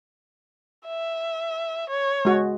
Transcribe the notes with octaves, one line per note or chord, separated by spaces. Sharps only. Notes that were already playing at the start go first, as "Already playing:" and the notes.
E5
C#5
G#3 F#4